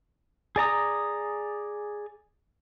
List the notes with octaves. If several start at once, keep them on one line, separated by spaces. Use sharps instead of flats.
G#4 D5 A#5 D#6